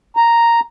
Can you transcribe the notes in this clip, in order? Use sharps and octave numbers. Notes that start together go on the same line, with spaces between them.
A#5